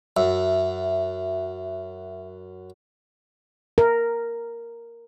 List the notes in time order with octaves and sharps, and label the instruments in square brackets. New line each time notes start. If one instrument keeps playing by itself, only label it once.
[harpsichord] F#2 [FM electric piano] E5
[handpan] A#4